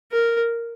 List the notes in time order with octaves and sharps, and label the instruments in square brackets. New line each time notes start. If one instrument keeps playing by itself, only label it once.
[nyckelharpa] A#4